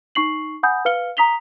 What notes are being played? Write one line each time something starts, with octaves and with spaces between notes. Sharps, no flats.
D#4 C#6 C7 F#7
F#5 G#5 B5 D#6 G6
B4 F5 F6 C#7 G7
A#5 D#6 B6 F7 G7